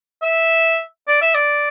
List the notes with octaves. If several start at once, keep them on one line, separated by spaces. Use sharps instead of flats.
E5
D5
E5
D5